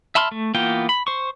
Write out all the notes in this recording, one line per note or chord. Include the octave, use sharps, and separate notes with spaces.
E5 A5 B5 C6 F6
A3
E3 A#3 B3 F4 G5
B5
C5 C#6